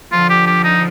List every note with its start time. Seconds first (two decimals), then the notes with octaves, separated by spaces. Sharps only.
0.12 D3 F3 F4
0.30 G4
0.47 G4
0.64 D#4